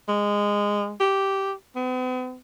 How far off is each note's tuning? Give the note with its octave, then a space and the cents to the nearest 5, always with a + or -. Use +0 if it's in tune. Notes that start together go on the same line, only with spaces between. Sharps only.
G#3 -15
G4 -10
B3 +45